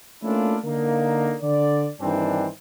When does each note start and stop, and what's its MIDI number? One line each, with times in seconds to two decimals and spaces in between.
0.23 0.56 57
0.23 0.56 58
0.23 0.56 61
0.23 0.56 62
0.23 0.56 64
0.23 0.56 65
0.64 1.35 50
0.64 1.35 58
0.64 1.35 63
1.42 1.88 50
1.42 1.88 74
2.00 2.47 43
2.00 2.47 51
2.00 2.47 52
2.00 2.47 60
2.00 2.47 62